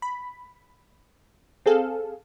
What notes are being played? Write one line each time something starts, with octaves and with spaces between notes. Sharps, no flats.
B5
C4 G#4 A4 F5